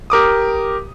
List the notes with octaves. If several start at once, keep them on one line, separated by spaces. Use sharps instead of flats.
G4 A#4 D6 D#6